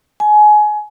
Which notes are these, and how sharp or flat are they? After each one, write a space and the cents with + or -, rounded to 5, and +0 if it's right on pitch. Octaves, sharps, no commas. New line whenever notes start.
G#5 +25